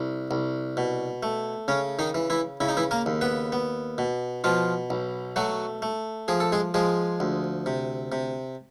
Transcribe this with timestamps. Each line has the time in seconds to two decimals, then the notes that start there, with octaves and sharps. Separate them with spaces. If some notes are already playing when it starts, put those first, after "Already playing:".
Already playing: C2
0.31 C2
0.77 B2
1.23 A3
1.68 C#3 C#4
1.99 D#3 D#4
2.15 E3
2.30 E3 E4
2.60 C#3 E4
2.69 D#4
2.77 E3 E4
2.91 A#3 A#4
3.06 D#2
3.21 B3 B4
3.52 B3
3.98 B2
4.44 B2 F3 F4
4.90 B1
5.36 F#3 A3 F#4
5.82 A3
6.28 F3 G#4
6.40 A4
6.52 G#3 G#4
6.74 F3 G#3 G#4
7.20 D2
7.66 C3
8.12 C3